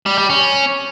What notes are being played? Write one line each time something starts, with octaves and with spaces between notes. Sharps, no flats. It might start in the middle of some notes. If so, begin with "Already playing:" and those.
G3
G3
C#4